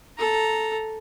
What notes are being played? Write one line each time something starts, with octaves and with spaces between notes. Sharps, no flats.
A4 A#5